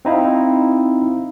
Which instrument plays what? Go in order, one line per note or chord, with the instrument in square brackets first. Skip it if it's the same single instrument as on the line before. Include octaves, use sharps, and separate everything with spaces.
[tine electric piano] C4 D#4 E4 F5